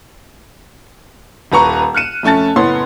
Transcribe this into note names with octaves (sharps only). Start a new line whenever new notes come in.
D#1 B4 A#5 C#6
F6 F#6 C#7 D#7 E7
F2 A3 C#4 A5 A6
F#1 A2 B3 C#5 C6